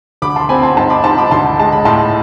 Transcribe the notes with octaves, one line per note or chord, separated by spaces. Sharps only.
D2 B5 D6
A5 C6
C4 G#5 B5
A5 C6
G#2 A5 C6
B5 D6
G#2 A5 C6
B5 D6
D2 A5 C6
G#3 A5
B5
A2 A5 C6